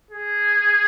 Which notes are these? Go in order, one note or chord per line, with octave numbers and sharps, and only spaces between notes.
G#4